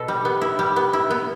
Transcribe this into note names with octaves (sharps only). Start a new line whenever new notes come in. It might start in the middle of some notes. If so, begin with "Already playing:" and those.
Already playing: B2 A4
G3
B3
E4
G3
B3
E4
B3